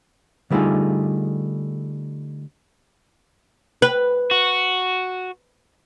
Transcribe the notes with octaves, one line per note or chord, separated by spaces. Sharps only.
D3 G3 A3 D#4 F4 G#4
B4
F#4